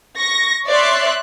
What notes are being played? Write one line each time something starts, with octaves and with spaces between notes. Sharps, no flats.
C#6 A#6
C#5 D5 E5 C6 F#6